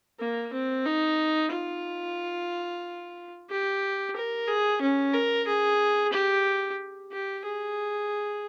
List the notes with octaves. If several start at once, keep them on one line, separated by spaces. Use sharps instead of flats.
A#3
C4
D#4
F4
G4
A#4
G#4
C#4
A#4
G#4
G4
G4
G#4